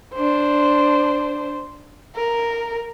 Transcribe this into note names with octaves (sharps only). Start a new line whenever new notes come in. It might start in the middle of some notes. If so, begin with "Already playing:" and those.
D4 C5
A#4